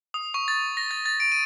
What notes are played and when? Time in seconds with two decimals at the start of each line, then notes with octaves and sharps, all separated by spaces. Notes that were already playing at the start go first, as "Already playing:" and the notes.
0.14 D#6
0.34 C#6
0.48 A6
0.77 A#6
0.91 A6
1.06 A6
1.20 D7
1.32 D#7